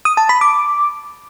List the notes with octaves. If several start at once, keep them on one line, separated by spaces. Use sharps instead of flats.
D#6
A5
B5
D6